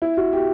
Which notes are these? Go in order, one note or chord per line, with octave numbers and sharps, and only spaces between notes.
E4
F#4
G4